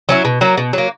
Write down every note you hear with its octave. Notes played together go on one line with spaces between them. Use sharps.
F#3 C#4 E4
B2
F#3 A#3
B2
F#3 A#3